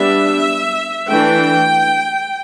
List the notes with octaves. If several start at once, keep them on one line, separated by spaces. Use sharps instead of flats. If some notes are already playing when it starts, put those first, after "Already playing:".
Already playing: G3 B3 D4 E5
E3 A3 D4 G5